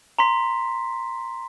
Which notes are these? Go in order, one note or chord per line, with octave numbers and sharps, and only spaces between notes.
A#5 C6 B6